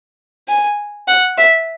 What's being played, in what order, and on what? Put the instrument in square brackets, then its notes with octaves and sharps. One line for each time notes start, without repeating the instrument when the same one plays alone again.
[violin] G#5
F#5
E5